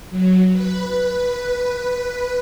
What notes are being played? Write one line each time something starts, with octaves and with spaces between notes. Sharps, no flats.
F#3
B4